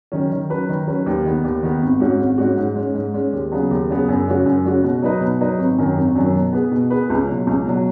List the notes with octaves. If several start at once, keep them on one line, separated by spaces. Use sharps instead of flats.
D#3 F#3 C#4
D#3
F#3 C#4 B4
D#3
F#3 C#4 B4
D#2
D#3 B3
D#2
D#3 B3
G#1
G#2 G#3 C#4 F#4
G#1
G#2 G#3 C#4 F#4
G#2
G#3 C#4
G#2
G#3 C#4
D#2
C#3 F#3 B3 G#4
D#2
C#3 F#3 B3 G#4
F#2
C#3 G#3 C#4 F#4
F#2
C#3 G#3 C#4 F#4
B2
F#3 D#4 B4 D#5
B2
F#3 D#4 B4 D#5
G#1
F#2 D#3 F#3
G#1
F#2 D#3 F#3
B2
B3 G#4 B4
B2
B3 G#4 B4
C#2
B2 F#3
C#2
B2 F#3